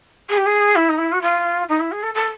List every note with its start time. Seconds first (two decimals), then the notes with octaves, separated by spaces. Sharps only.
0.29 G#4
0.37 G4
0.46 G#4
0.75 E4
0.89 D#4
0.98 E4
1.12 F#4
1.22 F4
1.69 D#4
1.80 E4
1.92 G#4
2.03 A4
2.14 A4